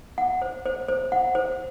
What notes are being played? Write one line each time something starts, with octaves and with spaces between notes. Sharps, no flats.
F#5
C5
C5
C5
F#5
C5